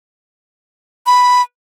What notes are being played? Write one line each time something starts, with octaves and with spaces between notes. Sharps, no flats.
B5